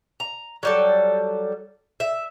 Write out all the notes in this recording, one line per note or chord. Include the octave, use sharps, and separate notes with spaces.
A#5
F#3 G3 A4
E5